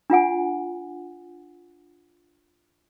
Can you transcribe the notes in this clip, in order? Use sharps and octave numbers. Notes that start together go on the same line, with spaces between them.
D4 F4 F#5 G#5